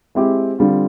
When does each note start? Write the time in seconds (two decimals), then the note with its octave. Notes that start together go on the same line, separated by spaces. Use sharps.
0.15 G#3 C4 E4 G4
0.59 D3 G3 C4 F4